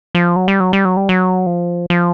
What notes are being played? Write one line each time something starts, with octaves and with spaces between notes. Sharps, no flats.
F3
F#3
G3
F#3
G3
F#3
G3
F#3
F3
F3